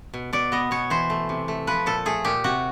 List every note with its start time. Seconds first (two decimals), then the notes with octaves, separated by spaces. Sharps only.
0.14 B2
0.33 B2 D5
0.52 B3 D#5
0.71 B2 C#5
0.90 E3 C5
1.10 A3
1.29 C3
1.48 A3
1.67 F3 B4
1.86 A#2 A4
2.06 A3 G#4
2.25 A#2 G4
2.44 C3 F#4